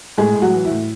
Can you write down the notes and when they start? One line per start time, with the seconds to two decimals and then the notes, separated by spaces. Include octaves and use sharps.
0.18 A2 G#3 G#4
0.35 A2
0.42 F#3 F#4
0.54 E3
0.65 E4
0.71 A2